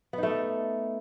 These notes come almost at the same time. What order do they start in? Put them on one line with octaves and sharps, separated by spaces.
B3 D#4 A3